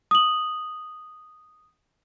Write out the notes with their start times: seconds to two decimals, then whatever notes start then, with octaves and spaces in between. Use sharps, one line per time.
0.11 D#6 F#7